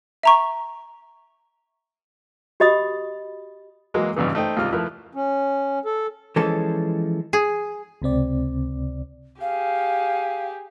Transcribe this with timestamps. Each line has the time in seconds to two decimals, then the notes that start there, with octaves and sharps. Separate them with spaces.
0.23 E5 A#5 C#6
2.60 F#4 G4 D#5 B5 D#6
3.94 E3 F#3 G#3 A#3 F#4
4.16 G#1 G2 C#3 E3
4.35 A3 D#4 C5 G5
4.56 G#1 C#2 C3 G3 F4 F6
4.72 F3 A3 E4 A#4 B4
5.15 C#4
5.85 A4
6.36 E3 F3 G#3 C#4 A4
7.33 G#4
8.02 C#2 C3 C4 D5
9.41 G4 G#4 F5